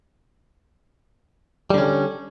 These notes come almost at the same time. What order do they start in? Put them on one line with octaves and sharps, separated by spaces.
G3 D3 C#4